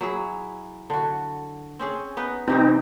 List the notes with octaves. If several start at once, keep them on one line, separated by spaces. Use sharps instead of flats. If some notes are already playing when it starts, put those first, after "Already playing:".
F#3 E4 G#4
D3 F#4
C4 C#4 G#4
B3 D#4 B4
C3 E3 G3 C4 D#4